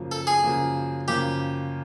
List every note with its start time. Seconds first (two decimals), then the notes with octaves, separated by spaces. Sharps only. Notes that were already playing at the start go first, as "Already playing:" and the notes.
Already playing: F#2 C#3 F3 A#3
0.12 A4
0.27 G#4
0.43 F#2 C#3 F3 A#3
1.08 F#2 C#3 F3 A#3 G4